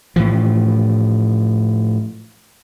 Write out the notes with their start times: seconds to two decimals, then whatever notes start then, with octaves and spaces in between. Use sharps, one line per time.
0.16 A2 E3 F3